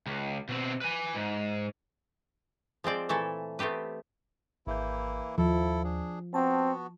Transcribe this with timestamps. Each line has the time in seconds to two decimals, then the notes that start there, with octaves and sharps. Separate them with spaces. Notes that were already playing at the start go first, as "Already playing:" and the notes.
0.06 C#2
0.49 B2 C4
0.81 B4 G#5
1.15 G#2
2.84 F3 G#3 C4 D5
3.09 A#2 E3 A3 E4 A4
3.59 A3 B3 C4 G4 B4
4.67 G#1 E3 A#3 E4 G6
5.38 D#2 F3 E4 A4
5.84 D4 G#4
6.34 B3 C4 F#4 A5